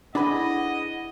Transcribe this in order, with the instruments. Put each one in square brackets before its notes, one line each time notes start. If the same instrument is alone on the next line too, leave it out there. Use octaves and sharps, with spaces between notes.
[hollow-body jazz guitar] D4 G#4 B5 [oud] E4 B4 [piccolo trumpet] D#5 [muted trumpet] F#5